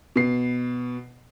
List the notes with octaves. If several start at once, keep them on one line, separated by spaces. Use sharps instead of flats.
B2 C7